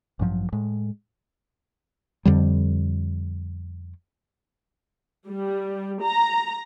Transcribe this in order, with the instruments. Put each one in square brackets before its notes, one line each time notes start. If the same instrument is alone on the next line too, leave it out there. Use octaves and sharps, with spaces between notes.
[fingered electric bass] A1 G2 F3 F#3
A2 G#3
[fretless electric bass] F2 D3 G3
[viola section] G3
A#5